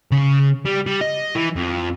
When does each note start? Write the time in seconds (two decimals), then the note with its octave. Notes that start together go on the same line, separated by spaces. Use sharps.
0.11 C#3
0.66 G3
0.87 G3
1.01 D#5
1.35 E3
1.56 F2